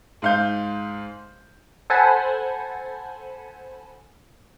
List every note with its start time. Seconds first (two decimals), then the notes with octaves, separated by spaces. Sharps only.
0.22 G#2 F5 G6
1.90 A4 C5 F#5 G#5 A5 B5